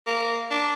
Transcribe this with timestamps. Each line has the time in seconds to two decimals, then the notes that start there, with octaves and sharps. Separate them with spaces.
0.07 A#3
0.51 D4